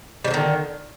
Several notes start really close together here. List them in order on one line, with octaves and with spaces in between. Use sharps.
G3 F3 D3 D#3